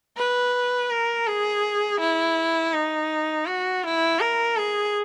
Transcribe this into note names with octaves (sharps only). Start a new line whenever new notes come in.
B4
A#4
G#4
E4
D#4
F#4
E4
A#4
G#4